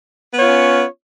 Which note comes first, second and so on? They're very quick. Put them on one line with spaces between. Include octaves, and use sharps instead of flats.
B3 C#5 F4 C#4